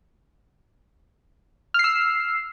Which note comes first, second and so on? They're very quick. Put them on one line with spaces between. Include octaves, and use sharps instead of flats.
F6 C7 E6